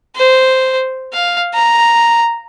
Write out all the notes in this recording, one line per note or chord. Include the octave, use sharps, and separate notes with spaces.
C5
F5
A#5